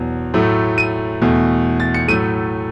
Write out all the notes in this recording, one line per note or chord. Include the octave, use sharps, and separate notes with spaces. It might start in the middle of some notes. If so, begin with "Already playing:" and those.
Already playing: E2 B2 F#3
A2 F#3 A3
D#7
E2 B2 A3
A6
C#7
A2 F#3 A3 D#7